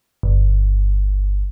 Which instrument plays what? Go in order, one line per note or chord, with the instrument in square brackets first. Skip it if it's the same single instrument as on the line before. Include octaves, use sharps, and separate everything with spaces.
[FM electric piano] G1